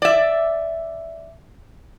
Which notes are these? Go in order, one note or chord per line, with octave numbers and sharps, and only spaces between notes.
D5 E5